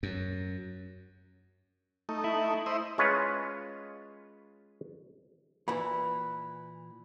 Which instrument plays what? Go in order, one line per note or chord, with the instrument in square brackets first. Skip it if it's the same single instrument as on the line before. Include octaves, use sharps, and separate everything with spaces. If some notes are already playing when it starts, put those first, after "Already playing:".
[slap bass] F#2
[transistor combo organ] A3 D#4
[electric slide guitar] E4
[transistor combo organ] C5 D#5 E5
[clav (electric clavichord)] G#3 C#4 F4 B4 C#5
[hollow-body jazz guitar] A#2 E3 [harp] B5